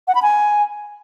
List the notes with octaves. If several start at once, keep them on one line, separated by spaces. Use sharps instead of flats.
F#5
B5
G#5